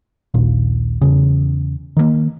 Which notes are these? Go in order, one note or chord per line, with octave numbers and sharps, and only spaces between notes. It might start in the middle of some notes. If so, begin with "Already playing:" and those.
A#1 D#2 A#2
E2 C#3
D#3 E3 A#3